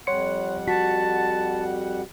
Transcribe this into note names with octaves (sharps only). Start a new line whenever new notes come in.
F2 G3 C#5 F#5 C6 C#7
F#4 A5 B6